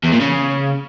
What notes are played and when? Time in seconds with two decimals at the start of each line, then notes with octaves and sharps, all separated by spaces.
0.04 E2
0.12 A#2
0.21 C#3